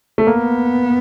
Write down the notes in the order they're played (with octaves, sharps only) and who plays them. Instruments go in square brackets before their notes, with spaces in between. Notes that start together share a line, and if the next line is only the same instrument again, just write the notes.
[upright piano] A3
[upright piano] A#3 [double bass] B3